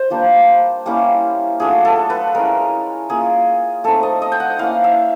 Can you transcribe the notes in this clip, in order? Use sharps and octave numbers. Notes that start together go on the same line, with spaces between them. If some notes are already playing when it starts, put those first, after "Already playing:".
Already playing: C5
G3 A#3 D4 F4
G3 A#3 C#4 E4
F#3 A3 D4 F4 G#4
A4
B4
G#3 C#4 E4 A#4
A#3 C#4 F4 G#4
A3 C4 D#4 A4
D#5
D#5
G5
F#5
A#3 C#4 E4 F5
E5